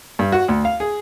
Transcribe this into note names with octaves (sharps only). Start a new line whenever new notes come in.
G2
F#4
D2
F5
G#4